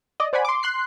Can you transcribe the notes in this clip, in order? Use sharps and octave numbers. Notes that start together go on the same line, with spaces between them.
D5 D#5
C5 D5 F#5 G#5 B5
C6 D6
C6 F#6 C7